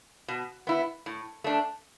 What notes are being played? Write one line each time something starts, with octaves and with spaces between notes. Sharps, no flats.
B2
B3 E4
A2
A3 D4